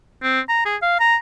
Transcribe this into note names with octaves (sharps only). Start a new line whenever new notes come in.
C4
A#5
G#4
F5
A#5